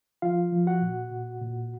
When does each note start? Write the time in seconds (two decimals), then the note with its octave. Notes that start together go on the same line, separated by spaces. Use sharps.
0.22 F3 F4 F5
0.52 F3
0.67 F#4 F#5
0.82 A#2
1.11 A#2
1.41 A#2